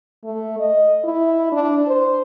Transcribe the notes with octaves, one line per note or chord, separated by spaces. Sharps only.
A3
D#5
E4
D4
C5